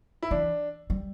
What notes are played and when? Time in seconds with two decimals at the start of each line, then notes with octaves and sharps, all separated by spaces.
0.23 E4
0.31 E3 D4
0.90 G3